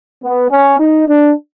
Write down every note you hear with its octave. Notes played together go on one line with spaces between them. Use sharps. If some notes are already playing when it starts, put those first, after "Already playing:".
B3
C#4
D#4
D4